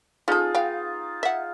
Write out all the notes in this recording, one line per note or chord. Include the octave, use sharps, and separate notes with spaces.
C#4 D#4 F4 G#4 A4
B3 F5 G5
E5 F#5